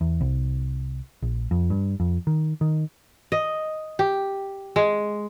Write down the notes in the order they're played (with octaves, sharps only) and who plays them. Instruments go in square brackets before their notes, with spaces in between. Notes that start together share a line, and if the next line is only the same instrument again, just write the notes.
[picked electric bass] E2
C2
A#1
F2
G2
F2
D#3
D#3
[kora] D#5
G4
G#3